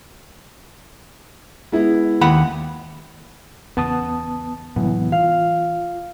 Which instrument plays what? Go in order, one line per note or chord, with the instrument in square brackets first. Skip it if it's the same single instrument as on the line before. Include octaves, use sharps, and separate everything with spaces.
[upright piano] G#3 B3 E4
[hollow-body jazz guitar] D#2 F#5 B5
[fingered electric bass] E2 C#3 [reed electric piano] B3 A5 D#6
[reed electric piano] C2 E3 B3 [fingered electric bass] A2 F#3 G#3
[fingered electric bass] E3 [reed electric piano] F4 [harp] F5